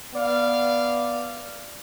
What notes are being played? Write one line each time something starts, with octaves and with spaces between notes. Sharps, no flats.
B3 D5 F5